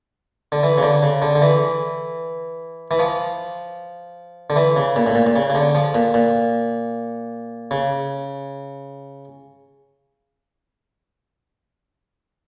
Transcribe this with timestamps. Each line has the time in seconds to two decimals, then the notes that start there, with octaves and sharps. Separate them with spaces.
0.52 D3
0.63 E3
0.78 C#3
0.83 D3
1.02 C#3
1.22 D3
1.35 D3
1.42 E3
2.91 E3
2.99 F3
4.50 D3
4.56 E3
4.76 C#3
4.96 A#2
5.06 A2
5.15 A#2
5.27 A#2
5.36 C#3
5.50 C#3
5.55 D3
5.75 F3
5.94 A#2
6.14 A#2
7.71 C#3